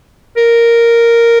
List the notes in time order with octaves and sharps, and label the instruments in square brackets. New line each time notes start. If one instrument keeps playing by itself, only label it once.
[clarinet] A#4